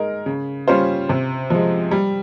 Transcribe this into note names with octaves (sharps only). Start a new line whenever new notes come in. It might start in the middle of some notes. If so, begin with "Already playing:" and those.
Already playing: G#3 D#4 A#4
C#3
G3 C#4 F4 C5
C3
F3 G#3
G3